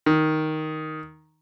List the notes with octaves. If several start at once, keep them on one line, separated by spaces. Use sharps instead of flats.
D#3